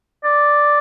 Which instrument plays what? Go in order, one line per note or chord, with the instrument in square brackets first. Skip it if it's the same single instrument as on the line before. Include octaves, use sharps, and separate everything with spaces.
[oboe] D5